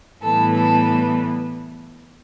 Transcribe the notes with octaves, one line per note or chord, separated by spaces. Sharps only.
A2 E3 G3 B3 A4
A4